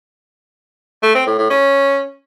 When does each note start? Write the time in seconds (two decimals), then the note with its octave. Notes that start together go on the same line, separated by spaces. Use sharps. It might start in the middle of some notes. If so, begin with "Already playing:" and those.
1.03 A3
1.15 C4
1.27 A2
1.39 A2
1.50 C#4